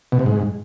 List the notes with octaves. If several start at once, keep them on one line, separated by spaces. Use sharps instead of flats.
B2
C3
G#2